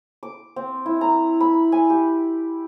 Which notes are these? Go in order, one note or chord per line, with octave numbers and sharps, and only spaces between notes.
D6
C4
E4
A#5
B5
G#5
G4